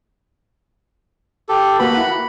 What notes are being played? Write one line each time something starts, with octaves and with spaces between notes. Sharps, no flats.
G4 A4
A#3 F#4 B4 B5
E4 F#5